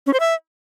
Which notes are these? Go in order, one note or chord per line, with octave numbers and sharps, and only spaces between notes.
C#4
C5
E5